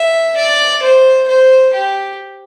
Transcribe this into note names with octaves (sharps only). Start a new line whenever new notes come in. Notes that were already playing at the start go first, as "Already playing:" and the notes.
Already playing: E5
D5
C5
C5
G4